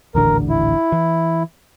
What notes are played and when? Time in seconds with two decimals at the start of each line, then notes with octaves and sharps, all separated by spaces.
0.15 D#1 A1 D3 A#4
0.49 E4
0.92 E3